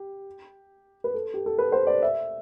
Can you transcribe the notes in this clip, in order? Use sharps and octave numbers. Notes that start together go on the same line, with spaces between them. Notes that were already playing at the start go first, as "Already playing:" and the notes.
Already playing: G4
B4
A4
G4
A4
B4
C5
D5
E5